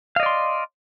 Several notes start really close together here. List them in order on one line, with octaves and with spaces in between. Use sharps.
F5 D#5 D5 C6